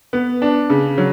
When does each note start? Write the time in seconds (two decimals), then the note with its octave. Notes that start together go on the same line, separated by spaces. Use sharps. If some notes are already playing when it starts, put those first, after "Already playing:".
0.13 B3
0.42 D4
0.70 C#3
0.98 F#3